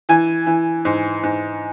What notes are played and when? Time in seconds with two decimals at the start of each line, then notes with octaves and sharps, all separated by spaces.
0.09 E3 G#5
0.46 E3
0.85 G#2
1.23 G#2